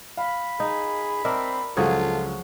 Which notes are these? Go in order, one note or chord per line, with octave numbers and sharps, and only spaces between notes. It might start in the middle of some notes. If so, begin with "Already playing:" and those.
F5 B5
D#4 G#4
C4 D4 A#4 D#5 E5
C#2 F3 F#3 F4 G#4 A4 C#6